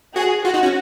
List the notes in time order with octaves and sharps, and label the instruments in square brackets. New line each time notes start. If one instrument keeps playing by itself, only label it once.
[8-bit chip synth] F#4 [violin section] G#4
[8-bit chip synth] F4 [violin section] F#4
[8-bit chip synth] D#4
C#4